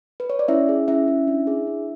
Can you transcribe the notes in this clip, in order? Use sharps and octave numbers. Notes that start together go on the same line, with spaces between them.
B4
C#5
D5
C#4 E4 E5
G#4
C#4 E4 E5
C#4
D4
G#4
D4